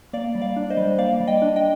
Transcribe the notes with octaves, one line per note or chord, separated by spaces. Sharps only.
A#3 D5 F5
G3
D5 F5
D4
C5 D#5
G3
A#3 D5 F5
G3
D#5 G5
D4
D#5 G5